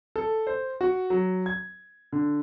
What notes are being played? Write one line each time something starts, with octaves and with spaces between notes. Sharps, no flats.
A4
C5
F#4
F#3
G#6
D3